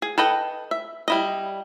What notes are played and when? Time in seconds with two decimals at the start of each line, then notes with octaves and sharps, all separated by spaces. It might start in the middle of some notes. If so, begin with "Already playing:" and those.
0.02 G#4
0.18 A4 B4 D#5 G5
0.71 E5
1.08 G3 E4 D#5